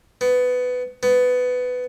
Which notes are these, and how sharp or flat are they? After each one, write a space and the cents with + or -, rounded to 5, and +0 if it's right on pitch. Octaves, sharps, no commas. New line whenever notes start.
B3 +15
B3 +15